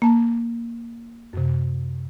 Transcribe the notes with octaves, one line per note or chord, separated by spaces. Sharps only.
A#3 A5
F#2 C3